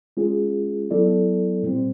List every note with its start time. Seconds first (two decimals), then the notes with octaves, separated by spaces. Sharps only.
0.17 G#3 C#4 F4 G#4
0.90 F#3 B3 E4 A4 D5
1.63 A#2 G3 C4